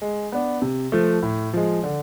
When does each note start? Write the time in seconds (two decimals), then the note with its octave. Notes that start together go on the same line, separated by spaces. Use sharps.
0.02 G#3
0.32 B3 D4
0.62 C3
0.92 F3 A3
1.23 A2
1.53 F3 G#3
1.84 D3